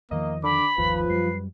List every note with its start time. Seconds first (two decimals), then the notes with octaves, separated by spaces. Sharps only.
0.11 E2 D#3 F3 A#3 D#5
0.44 D3 B5 D6
0.78 G1 D#2 F3 B4
1.10 F#2 G3 C7